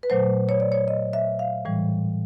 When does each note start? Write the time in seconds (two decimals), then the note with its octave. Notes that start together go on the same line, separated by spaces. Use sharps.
0.03 B4
0.10 A#2 F#3 A3 C5
0.49 C#5
0.60 D5
0.72 C#5
0.88 D#5
1.13 E5
1.39 F5
1.65 A2 E3 G3